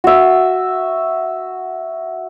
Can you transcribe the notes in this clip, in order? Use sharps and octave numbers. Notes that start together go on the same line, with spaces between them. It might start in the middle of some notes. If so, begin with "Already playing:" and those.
F#4 E5